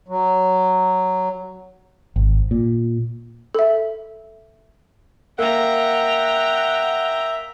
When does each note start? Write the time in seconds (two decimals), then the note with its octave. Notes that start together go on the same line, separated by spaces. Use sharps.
0.08 F#3
2.16 G#1
2.51 A#2
3.55 A4 E5
5.39 A#3 E5 F#5 G5 A#5